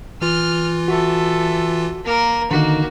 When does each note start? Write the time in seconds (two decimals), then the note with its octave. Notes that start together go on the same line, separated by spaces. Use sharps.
0.22 E3 F4 F6
0.88 F#4 A4 E5
2.05 A#3 A#4
2.51 D3 D#3 A#3 D#4 F#4